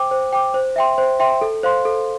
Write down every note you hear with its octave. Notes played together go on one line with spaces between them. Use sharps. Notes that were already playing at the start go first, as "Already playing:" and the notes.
Already playing: C5 G5 D6
C5
G5 D6
C5
E5 G5 C6
C5
E5 G5 C6
A4
C5 F5 C6
A4